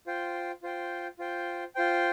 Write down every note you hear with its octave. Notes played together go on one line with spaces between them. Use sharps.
F4 C5 G5
F4 C5 G5
F4 C5 G5
F4 C5 G5